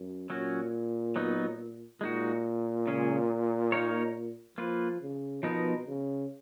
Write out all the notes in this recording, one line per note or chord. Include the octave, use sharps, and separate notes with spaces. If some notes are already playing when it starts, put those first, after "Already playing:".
Already playing: F#2
A#2 F#3 C#4 F#4
F#3 B3 D#4
A#2 G#3 D#4 F#4
C#3 G#3 C#4 G#4
A#3 D#4 A#4 C#5
F3 A#3 F4 B4
C#3
B2 F3 B3 D#4 A#4
C#3